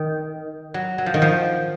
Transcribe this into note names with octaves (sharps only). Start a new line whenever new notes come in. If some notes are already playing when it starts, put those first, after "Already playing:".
Already playing: D#3
F#3
F#3
F3
D#3
F3